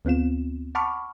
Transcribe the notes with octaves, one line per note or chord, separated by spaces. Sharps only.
D2 B3 C4 F4 E7
F#5 A5 B5 C#6 D6 F6